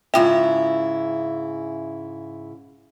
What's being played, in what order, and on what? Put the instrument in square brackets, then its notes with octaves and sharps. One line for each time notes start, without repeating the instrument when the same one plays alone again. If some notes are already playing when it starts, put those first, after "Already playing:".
[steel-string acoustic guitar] G#2 C#3 E4 [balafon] F4 G5 [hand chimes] E5